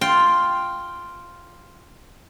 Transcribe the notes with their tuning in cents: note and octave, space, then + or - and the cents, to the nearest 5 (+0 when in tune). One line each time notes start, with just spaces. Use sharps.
F4 +0 G5 +0